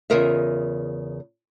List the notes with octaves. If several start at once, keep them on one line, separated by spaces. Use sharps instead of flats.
E2 C#3 F4 A#4 D#5 E5